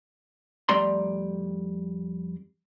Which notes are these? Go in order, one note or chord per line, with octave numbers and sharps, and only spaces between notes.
F2 G3 A3 D5 A#5 C6